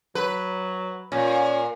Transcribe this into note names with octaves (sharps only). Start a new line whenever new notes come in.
F#3 B4
A#2 C#4